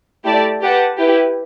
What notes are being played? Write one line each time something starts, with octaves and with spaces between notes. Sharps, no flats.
A3 E4 G4 D5 A5
G4 B4 F#5 A5
E4 G4 B4